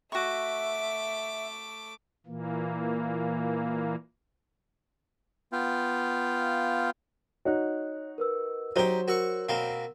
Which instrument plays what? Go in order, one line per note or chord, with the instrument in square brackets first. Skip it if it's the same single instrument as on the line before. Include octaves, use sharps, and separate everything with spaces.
[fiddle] A3 D6 [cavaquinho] F#4 C#6 [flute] E5
[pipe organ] A#2 E3 A#3
[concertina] B3 F4 F5 G5
[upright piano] D#4 F#4 [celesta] C#5 F#6
[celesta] A#4 B4 E6
[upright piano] F#3 C5 G7 [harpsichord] D#4 G4
[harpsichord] F#4 C#6 [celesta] A#4 E6
[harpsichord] B2 A#3 C4